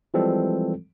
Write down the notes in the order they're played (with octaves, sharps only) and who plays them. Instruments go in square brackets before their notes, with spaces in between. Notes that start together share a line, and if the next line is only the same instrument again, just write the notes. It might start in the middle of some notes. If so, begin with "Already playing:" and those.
[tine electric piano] E3 F3 G3 G#3 C4 A4